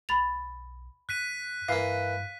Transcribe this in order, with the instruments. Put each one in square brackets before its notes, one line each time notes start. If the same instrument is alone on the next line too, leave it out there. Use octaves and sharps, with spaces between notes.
[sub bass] B1 [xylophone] B5 A6 F7
[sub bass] F2 [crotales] F#6 B6 D#7
[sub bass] G2 [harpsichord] E3 A#3 [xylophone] F5